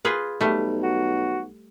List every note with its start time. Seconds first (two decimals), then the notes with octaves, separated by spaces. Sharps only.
0.05 F4 G#4 B4
0.41 B1 G3 A3
0.83 F#4